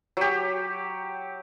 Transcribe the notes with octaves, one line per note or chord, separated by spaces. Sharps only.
F#3 G4